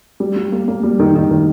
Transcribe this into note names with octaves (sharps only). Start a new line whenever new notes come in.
G3
G3
A#3
A#3
G3
D#3
D#3
D#3